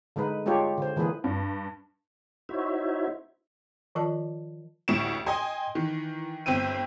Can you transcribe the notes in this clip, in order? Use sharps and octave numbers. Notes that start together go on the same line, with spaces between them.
D3 G#3 D#4 B4
G#3 D4 F4 G4 C#5
D3 C5
D3 E3 G#3 A#3 G#4 B4
G2
D#4 E4 F#4 C5 C#5 E5
D#3 F3 F4 A#4 D#5 A5
A1 D2 E4 C#6 D7 E7
D#5 G5 G#5 C6
D#3 E3
G1 C4 G5 E6 D#7